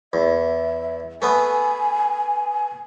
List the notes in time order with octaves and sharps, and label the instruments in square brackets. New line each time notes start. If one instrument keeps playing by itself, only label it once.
[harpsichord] E2 [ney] E5
[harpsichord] A3 B3 B4 [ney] G#5